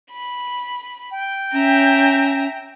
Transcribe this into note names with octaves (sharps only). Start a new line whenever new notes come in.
B5
G5
C#4 E5 A#5